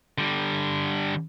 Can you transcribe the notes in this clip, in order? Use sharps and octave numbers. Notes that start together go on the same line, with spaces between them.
D3 G3